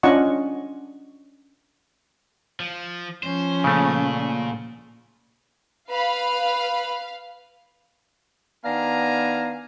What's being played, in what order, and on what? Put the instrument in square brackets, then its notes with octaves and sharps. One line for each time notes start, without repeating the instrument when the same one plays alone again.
[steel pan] C#4 D4 F4 D#5 F#5 C#6
[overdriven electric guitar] F3
[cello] F3 C#4 [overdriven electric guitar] C5
[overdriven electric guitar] A#2 [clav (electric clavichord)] C#3 A3
[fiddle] B4 B5 [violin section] F5
[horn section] D#3 B3 D4 F5 G#5 A#5